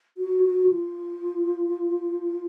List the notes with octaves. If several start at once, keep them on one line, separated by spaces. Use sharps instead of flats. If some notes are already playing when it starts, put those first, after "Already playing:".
F#4
F#4
F4